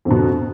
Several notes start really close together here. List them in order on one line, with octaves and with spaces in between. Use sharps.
F2 D3 B2